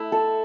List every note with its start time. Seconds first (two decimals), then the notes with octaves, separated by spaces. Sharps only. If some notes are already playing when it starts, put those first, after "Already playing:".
Already playing: A3 E4
0.12 A4